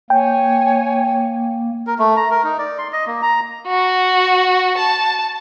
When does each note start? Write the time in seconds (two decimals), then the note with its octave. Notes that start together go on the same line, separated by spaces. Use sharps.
0.10 A#3 C#5 G5 G#5
1.87 A#4
1.99 A3
2.17 A#5
2.31 A#4
2.44 D#4
2.59 D5
2.78 C6
2.93 D#5
3.07 A#3
3.22 A#5
3.67 F#4
4.78 A5